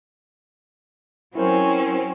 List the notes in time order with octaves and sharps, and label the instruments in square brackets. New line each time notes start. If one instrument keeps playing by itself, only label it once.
[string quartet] F#3 C4 C#4 [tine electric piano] E4 A#4 C5